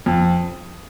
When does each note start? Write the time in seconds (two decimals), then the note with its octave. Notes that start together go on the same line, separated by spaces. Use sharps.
0.06 F2